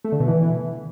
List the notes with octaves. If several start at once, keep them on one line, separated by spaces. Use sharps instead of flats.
A3
D3
B2
E3